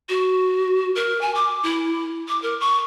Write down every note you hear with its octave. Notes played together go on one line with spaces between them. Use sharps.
F#4
A#4
G#5
D6
E4
D6
A#4
C#6